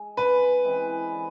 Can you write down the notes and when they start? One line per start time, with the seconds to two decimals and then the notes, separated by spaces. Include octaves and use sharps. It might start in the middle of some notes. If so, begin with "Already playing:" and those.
Already playing: G#3
0.17 C#3 B4
0.64 E3 G#3 C4
1.12 D3